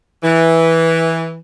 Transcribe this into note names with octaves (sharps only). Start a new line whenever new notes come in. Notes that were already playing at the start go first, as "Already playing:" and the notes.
E3